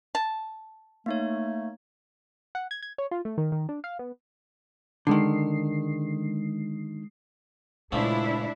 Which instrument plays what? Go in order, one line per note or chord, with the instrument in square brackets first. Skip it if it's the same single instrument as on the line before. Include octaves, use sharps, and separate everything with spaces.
[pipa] A5
[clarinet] A3 [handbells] A#3 D#4 C#5
[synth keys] F#5
G#6
G#6
C#5
F4
A3
D#3
D#3
D4
F5
B3
[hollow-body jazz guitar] D3 D#3 [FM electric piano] G#3 C7
[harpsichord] C#2 F3 A3 [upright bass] A#2 [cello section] D4 E4